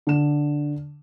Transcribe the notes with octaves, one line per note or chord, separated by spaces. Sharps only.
D3 E7